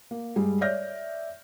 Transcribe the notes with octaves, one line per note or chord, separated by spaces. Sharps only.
A#3
G2 G3 G#3
C#5 D5 E5 F6 G6 A#6